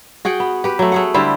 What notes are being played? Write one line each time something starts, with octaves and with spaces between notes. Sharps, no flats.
F#4 G#4 F#5 G5
B3
G4 B4
F#3 A3
A3 G#4 F#5
D3 G3 E4 C5